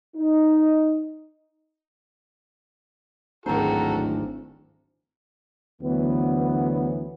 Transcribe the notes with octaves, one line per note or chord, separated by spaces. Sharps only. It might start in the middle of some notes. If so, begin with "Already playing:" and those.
D#4
D1 G#1 F#4 A4 C5 A#5
D2 D3 E3 F#3 B3